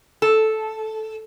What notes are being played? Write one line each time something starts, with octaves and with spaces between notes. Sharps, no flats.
A4